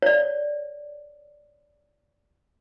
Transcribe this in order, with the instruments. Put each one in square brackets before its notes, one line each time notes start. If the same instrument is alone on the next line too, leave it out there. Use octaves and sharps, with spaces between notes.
[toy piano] C#5 D5